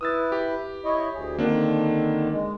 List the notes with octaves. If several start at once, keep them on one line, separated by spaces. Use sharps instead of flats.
E4 B4 D#6 E6 A6
G4
E4 C#5 D#5
D2 G#4
D3 D#3 A#3 C4 D4
G#3